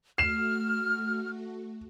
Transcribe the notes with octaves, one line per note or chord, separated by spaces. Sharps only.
A3 F#4 F6 C7 E7